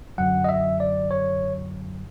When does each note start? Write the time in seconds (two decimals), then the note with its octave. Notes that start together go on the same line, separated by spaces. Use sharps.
0.18 F#2 D3 F#3 F#5
0.44 D#5
0.49 E5
0.80 D5
1.11 C#5